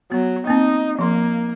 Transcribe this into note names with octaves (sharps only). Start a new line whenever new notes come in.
F#3 B3
A#3 C4 D#4
F3 A#3 C6